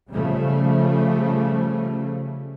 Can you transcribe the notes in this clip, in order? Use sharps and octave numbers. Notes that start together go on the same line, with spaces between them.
C#3 F3 G3 A3